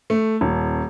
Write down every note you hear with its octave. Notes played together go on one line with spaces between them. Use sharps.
A3
D#1